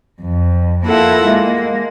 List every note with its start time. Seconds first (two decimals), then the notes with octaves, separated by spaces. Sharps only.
0.20 F2
0.85 A#3 E4 F4 A4 E5 F#5
1.25 G#3 A#3